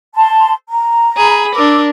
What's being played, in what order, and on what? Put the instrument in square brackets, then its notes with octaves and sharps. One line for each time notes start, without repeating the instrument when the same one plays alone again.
[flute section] A5 C6
A#5
[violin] G#4 B5
[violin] D4 A#4 [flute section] D6 E6